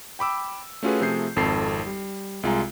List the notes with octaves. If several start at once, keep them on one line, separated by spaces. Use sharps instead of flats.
G5 B5 D6 E6
A3 C#4 F4 F#4 G#4 B4
C3 F3 A3 G#4 G6 C7
G#1 F2 A4 A5 C7
G3
C2 G#3 F4 G#5 A#5